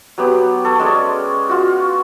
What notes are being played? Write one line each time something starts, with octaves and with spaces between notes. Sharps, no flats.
F#3 B3 G4
A4 C#5
G#3 C#4 D5
F4 F#4